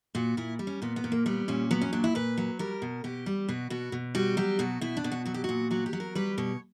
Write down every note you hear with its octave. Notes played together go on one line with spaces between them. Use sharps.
A#2 F#4
A#2 E4
G3
C#4
A#2 B3
B3
A#2
A#3
G3 B3
A#2 C#4
F#3 B3
C#4
A#2 D4
E4
A#2 B4
F#3
G3 A#4
B2
B2 G4
G3
B2 F#4
B2 F#4
B2
G3 F#4
F#3 G4
B2 F#4
B2 E4
D4
B2
F#4
F#3 F#4
G4
A#2 F#4
F#3 F#4
G4
F#3
A#4
G3 B4
B2 C#5